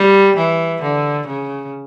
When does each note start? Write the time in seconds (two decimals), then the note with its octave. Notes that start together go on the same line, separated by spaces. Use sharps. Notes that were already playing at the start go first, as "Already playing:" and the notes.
Already playing: G3
0.37 E3
0.82 D3
1.28 C#3